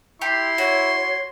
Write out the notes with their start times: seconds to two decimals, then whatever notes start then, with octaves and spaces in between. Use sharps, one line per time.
0.22 E4 G4 C6
0.58 F#4 C#5